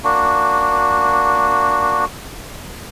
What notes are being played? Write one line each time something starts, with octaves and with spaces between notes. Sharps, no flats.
A#3 D4 F#4